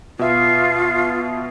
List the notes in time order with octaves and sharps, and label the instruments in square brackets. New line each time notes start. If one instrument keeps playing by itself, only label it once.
[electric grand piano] B2 E5 [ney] F4